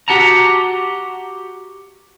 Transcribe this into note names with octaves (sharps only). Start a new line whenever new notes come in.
F#4 G4 F#5 A5 A#5